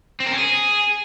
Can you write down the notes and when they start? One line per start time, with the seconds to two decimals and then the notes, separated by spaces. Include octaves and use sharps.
0.20 C4
0.26 A#4
0.32 C#4
0.38 G#4